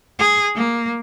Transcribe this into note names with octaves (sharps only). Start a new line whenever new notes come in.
G#4
A#3